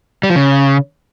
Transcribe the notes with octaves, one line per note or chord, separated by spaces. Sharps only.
G3
F3
C#3